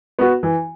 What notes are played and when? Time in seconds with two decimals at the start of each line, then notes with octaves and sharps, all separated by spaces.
0.19 B3 F#4
0.43 E3